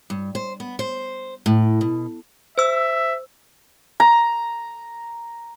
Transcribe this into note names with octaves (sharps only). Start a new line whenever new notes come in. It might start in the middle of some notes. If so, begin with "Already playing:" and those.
G2
C5
B3
C5
A2
B2
C5 E5 E6
A#5